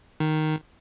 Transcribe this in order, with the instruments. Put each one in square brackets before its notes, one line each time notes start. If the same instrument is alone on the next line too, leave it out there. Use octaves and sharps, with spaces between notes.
[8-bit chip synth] D#3